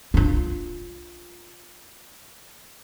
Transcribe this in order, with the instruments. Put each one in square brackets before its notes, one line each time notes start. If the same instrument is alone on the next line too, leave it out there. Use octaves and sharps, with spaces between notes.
[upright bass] D4 F4